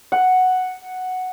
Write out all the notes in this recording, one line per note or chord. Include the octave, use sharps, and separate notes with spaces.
F#5